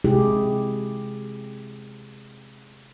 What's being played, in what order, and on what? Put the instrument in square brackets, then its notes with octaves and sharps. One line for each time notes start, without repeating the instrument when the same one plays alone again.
[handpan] C3 G#3 E4 G4 G#4